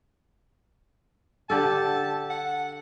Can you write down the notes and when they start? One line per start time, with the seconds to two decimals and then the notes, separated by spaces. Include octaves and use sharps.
1.50 D3 G4 A4 A5
2.30 F#5